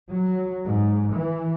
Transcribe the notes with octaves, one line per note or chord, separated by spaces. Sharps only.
F#3
G#2
E3